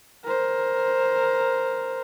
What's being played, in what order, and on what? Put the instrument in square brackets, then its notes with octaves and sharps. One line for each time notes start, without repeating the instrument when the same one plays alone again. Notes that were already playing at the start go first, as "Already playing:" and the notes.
[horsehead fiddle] A#4 C5